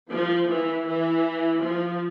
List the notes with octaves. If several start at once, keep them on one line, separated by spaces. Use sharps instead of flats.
F3
E3
E3
F3